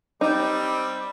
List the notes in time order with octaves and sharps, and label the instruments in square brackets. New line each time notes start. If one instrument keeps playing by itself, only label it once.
[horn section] G3 C4 [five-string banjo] D#4 [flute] D6